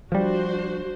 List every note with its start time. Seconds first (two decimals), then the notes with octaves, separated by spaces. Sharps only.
0.12 F3 G3 D4 F#4 C5